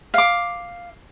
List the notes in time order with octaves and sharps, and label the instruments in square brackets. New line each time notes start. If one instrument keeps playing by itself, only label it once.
[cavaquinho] F5 D6